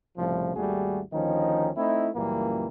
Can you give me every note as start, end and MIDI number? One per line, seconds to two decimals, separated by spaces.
0.18 0.55 36
0.18 0.55 45
0.18 0.55 49
0.18 0.55 53
0.55 1.00 32
0.55 1.00 39
0.55 1.00 55
0.55 1.00 57
0.55 1.00 66
0.55 1.00 68
1.13 1.70 38
1.13 1.70 51
1.13 1.70 53
1.13 1.70 61
1.13 1.70 63
1.77 2.08 57
1.77 2.08 60
1.77 2.08 63
1.77 2.08 64
2.15 2.67 37
2.15 2.67 42
2.15 2.67 46
2.15 2.67 52
2.15 2.67 55
2.15 2.67 58